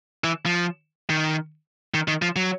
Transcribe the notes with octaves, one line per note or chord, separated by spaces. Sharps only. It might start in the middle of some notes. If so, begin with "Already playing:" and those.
E3
F3
D#3
D#3
D#3
F3
F#3